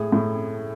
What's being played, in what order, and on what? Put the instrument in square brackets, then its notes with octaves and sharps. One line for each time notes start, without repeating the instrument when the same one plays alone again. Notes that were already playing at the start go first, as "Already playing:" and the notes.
Already playing: [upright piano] A2 G#4
A2